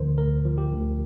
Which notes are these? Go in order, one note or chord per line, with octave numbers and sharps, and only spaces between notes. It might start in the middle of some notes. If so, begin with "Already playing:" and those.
Already playing: D2 D3 F3 A#4 C5
D2 A#4
F3
G4
D2